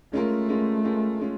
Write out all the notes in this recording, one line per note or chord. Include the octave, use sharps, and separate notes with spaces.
G#3 A3 C#4 F4 A#4
G#3 C#4 F4 A#4
G#3 C#4 F4 A#4
G#3 C#4 F4